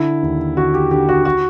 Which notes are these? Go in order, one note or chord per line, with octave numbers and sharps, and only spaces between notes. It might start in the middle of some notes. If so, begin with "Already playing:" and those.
Already playing: D3 E4
D#2
D3 F#4
G4
D3 G4
F#4
F#4